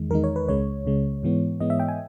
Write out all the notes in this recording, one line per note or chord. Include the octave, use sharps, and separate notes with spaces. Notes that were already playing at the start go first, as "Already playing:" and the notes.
Already playing: E2 D#3 G#3
E2 D#3 G#3 D#4 A#4
C#5
B4
C#2 C#3 G#3 C#5
C#2 C#3 G#3
G#2 E3 G#3 B3
G#2 E3 G#3 B3 D#5
E5
G5
G#5